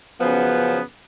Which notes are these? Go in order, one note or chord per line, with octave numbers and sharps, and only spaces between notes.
F#2 C#3 F3 B3